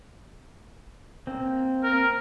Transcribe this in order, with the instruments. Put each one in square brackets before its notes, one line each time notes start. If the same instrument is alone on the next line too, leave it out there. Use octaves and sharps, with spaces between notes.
[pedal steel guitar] A#3 C4
[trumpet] A#4